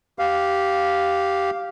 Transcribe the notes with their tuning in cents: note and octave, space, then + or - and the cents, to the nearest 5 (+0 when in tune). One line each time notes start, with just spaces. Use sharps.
G4 -10 F5 +0